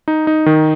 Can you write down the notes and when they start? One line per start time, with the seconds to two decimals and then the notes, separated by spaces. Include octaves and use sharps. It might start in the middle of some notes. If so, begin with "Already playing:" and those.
0.08 D#4
0.27 D#4
0.46 D#3